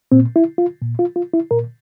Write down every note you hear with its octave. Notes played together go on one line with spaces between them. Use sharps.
A#2 C4
E4
F4
A#2
F4
F4
E4
A#2 A#4